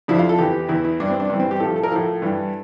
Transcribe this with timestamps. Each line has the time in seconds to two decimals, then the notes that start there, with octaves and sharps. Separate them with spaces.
0.08 F2 D3 F3 E4
0.19 F4
0.29 A4
0.38 E2 E3 G4
0.69 E2 E3 E4
0.85 E4
1.00 G2 E3 D4
1.10 C4
1.20 D4
1.30 G2 C4
1.33 E3
1.40 C4
1.51 G4
1.60 A2 F3 A4
1.76 A4
1.83 A#4
1.91 A2 F3 A4
2.22 G2 E3